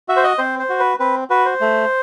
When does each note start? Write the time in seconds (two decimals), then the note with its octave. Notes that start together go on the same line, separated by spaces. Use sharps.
0.08 F#4 E5
0.16 C5
0.24 D#5
0.38 C4 C5
0.59 C5
0.69 F#4
0.79 B4
0.99 C4 B4
1.30 F#4 B4
1.46 C5
1.61 A3